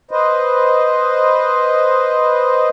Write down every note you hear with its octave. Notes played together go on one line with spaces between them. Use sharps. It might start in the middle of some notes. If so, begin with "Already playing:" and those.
B4 C5 D#5